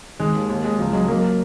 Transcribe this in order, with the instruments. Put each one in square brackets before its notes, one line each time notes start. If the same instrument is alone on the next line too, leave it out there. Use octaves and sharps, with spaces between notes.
[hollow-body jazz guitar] D#3 [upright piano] G#3
[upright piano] D#2
D#2
G#3
[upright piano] C#2 [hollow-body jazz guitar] F3
[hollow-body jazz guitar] F#3 [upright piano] G#3
[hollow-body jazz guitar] F#3 [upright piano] A#3